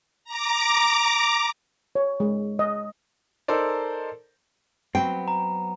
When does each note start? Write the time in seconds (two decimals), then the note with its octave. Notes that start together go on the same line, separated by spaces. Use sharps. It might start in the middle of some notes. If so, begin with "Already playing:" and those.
0.24 A#5 D6
1.95 C#5
2.20 G#3
2.59 D#5
3.48 D#4 A4 A#4 C5 D5
4.95 F#3 B3 C4 G5
5.28 A#5